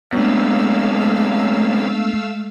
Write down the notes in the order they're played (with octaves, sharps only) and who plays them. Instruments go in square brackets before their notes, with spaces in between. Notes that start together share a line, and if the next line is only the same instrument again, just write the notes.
[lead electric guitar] F#2 C3 [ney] G#3 [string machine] A3 F5 E6 [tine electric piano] B3 D4